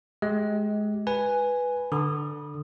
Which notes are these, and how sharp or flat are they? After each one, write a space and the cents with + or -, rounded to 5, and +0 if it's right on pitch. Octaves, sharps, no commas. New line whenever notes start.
G#3 +20 G4 +0 D#5 +30
B4 +0 G#5 +0
D3 +10 B5 -25 D#6 -10